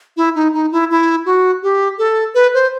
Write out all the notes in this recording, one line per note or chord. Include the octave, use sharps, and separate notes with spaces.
E4
D#4
D#4
E4
E4
F#4
G4
A4
B4
C5